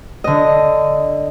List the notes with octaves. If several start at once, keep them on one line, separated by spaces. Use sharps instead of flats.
D3 D#5